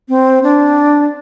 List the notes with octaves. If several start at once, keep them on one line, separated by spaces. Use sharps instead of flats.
C4
D4